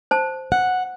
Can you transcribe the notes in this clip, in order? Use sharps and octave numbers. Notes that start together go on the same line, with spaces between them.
C5 A5
F#5